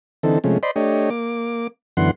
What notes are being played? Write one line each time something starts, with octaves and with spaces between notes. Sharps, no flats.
D3 E3 C4 D#4 A4
C3 F3 G#3 A3 C#4
C5 D5 D#5 B5 C6
A3 D4 G4 C#5 D#5
A#3 D6
F#2 D3 E3 B3 F#5 C6